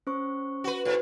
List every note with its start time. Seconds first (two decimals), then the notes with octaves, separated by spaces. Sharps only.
0.07 C#4 C5 C#6
0.64 F#4 B4
0.85 G#2 F#4 B4 C5